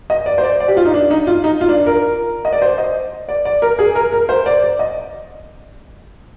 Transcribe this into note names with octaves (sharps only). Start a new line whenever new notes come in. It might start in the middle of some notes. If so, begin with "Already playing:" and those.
D#5
D5
C5
D5
D5
G4
F4
D#4
D4
D#4
F4
D#4
F4
D4
A#4
D#5
D5
C5
D#5
D5
D5
A#4
G#4
A#4
A#4
C5
D5
D5
D#5